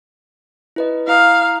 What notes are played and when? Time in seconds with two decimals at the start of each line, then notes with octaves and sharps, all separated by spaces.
0.76 E4 B4 D#5
1.08 E4 F5 A#5 D#6